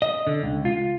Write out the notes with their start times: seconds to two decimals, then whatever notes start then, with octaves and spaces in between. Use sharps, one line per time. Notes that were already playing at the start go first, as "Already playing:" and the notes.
0.02 D#5
0.27 D3
0.43 C#2
0.65 F4